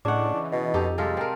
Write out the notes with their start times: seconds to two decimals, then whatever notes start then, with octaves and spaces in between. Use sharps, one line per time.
0.05 A2 C#3 D4 D#5 F#5 C#6 D6
0.34 E3
0.52 B2 D#5
0.74 F2 D#4 G4 A4
0.98 C3 G3 G#3 A4 F5 F6 A6
1.17 C4 A#4 G5 A5